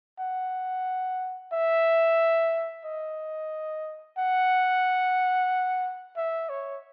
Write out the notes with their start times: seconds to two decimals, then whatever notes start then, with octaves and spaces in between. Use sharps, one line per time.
0.20 F#5
1.53 E5
2.85 D#5
4.18 F#5
6.17 E5
6.49 C#5